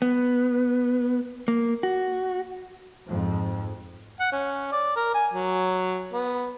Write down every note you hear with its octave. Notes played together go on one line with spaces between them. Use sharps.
B3
A#3
F#4
F2 G#2 F3
F#5
C#4
D5
A#4
G#5
F#3
B3